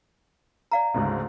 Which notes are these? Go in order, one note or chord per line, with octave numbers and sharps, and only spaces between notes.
D5 F5 A#5
D2 G#2 C#3